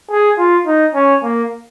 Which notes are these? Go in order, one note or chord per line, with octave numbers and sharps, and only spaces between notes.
G#4
F4
D#4
C#4
A#3